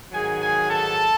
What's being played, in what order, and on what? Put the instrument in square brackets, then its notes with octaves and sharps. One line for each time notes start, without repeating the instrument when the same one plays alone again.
[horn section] G#2 D#3 F#3 G#4 G#5
G#4 G#5
A4 A5